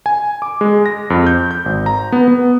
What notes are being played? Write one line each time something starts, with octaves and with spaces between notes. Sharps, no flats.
G#5
D6
G#3
A#6
F2
G6
G6
G#1
A#5
B3
B3